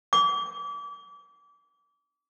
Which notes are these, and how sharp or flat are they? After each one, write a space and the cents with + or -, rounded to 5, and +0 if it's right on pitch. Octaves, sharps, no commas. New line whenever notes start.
D6 -30